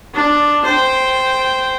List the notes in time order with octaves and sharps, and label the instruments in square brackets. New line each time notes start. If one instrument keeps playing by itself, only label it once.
[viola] D4
C5 G5